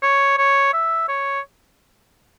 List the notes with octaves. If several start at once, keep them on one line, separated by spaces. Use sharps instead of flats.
C#5
C#5
E5
C#5